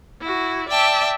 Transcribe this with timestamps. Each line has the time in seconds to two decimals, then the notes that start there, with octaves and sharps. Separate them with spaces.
0.21 E4 F#4
0.68 D5 E5 G5 A5